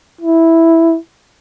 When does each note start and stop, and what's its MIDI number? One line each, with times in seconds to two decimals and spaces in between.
0.21 0.96 64